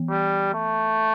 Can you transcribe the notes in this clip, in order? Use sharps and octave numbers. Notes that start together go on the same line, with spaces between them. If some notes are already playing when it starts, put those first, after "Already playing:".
Already playing: E3 B3
G3
A3